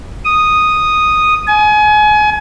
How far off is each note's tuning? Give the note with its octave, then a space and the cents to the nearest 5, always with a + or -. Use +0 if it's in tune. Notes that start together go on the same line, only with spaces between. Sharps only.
D#6 -5
G#5 +30